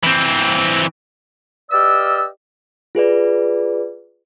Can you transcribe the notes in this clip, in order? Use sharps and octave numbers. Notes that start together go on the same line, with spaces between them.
E3 C4
G4 B4 D5 D#5 F5 E6
F4 G#4 B4 D5